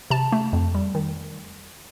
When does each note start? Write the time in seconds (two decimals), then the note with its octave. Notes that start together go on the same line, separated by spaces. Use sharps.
0.10 C3 A5
0.32 A3
0.53 F2
0.75 G3
0.95 D#3